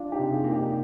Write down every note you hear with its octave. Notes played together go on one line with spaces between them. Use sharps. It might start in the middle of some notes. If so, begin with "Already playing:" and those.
Already playing: D4 F4
D#4 G4
C3
F4 G#4
A#3
D#4 G4